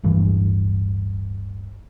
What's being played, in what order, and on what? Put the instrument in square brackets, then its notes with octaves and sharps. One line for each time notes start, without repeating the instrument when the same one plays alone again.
[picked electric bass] D1 G1 G2 E3